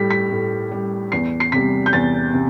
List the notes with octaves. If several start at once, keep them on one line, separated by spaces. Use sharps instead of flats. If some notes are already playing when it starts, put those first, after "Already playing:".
Already playing: A2 G3 B6
B6
A2
G3
E2 C7
C7
C3 G3 B6
G6
E2 A6
C3